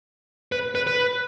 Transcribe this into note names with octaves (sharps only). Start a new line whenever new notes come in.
B4
B4
B4